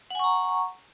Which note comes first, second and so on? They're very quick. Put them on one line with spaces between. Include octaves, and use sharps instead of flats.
F#5 G#5 C#6 A#5